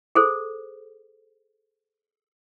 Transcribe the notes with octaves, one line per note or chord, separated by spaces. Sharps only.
G#4 A4 C5